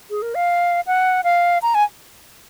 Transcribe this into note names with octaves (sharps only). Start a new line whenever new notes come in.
G#4
A#4
F5
F#5
F5
A#5
G#5